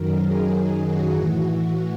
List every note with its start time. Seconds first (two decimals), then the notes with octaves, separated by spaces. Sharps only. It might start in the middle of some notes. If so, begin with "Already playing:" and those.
Already playing: F#2 D#3 F#3 A#4
0.23 G#4
0.53 F#2 D#3 F#3
0.83 F#4
1.13 A2 E3
1.43 F#4